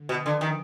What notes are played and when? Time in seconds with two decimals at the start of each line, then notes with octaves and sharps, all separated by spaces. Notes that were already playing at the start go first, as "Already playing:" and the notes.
Already playing: D3
0.09 B2 F3
0.26 D3
0.41 D#3